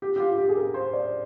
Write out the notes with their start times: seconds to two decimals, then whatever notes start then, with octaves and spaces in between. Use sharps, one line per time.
0.02 G4
0.16 G4
0.20 F4
0.38 G4
0.49 G#4
0.57 A#4
0.74 C5
0.93 D5